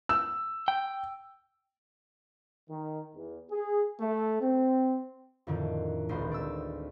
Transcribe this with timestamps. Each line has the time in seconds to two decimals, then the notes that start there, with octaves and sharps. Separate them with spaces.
0.09 E6
0.68 G5
2.69 D#3
3.15 E2
3.50 G#4
4.00 A3
4.41 C4
5.47 F2 A2 D3 D#3
6.09 D#1 G#1 D2 B3 C5
6.31 D5 E6